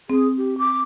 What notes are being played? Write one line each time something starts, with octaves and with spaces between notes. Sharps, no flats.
C4 G#4
G4
D6